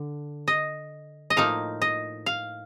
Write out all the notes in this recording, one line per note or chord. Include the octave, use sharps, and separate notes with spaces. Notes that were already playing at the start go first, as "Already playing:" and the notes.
Already playing: D3
D#5
D#5
A2 F3 A#3 D#4 F5
D#5
F5